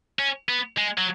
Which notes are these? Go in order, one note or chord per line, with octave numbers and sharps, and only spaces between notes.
C#4
B3
G#3
F#3